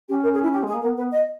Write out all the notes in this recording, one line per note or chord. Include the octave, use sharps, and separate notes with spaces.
C#4 G4
A#4
G#4
E4
G4
G#3
G#4
A#3
B3 A#4
B3 B4
D#5